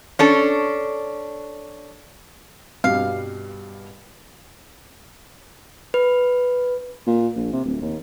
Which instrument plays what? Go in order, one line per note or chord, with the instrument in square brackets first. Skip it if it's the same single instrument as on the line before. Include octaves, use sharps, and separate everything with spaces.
[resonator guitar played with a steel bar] C#4 D4 A4
[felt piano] G2 B2 G3 [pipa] F5
[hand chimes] B4
[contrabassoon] A#2
A#1
C3
D1
D#2